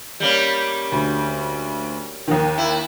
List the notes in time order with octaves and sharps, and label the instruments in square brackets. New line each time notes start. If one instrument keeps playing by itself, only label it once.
[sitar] G3 A#3 C#4
[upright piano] D2
D#2 D#3
[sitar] E4